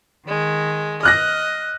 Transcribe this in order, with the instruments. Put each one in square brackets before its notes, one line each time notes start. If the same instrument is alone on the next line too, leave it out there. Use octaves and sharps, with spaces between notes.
[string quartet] D#3 G#3
[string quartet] D#5 [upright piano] F6 F#6 A#6